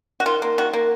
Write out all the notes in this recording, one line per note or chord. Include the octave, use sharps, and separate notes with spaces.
F#4
D#3 F4
A#3
D#3 F#4
A#3